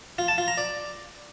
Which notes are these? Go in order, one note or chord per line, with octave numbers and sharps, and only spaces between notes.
F4
A5
F4
A#5
D5